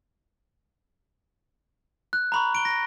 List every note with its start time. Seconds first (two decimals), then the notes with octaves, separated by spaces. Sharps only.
2.13 F#6
2.32 A#5 B5 C#6
2.53 B5 D7 G7
2.65 A#6